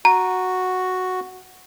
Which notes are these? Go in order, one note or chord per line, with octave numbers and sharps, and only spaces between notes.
F#4 A#5